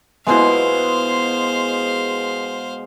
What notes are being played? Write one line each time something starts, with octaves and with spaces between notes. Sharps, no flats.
B2 G#3 B3 E4 C5 F5